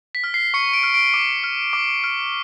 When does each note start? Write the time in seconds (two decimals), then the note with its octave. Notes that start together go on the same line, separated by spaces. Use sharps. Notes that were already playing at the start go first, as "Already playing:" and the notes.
0.15 B6
0.24 F6
0.34 C7
0.54 C#6 C#7
0.73 D7
0.83 F6
0.94 D7
1.14 D6
1.44 F6
1.73 D6
2.04 F6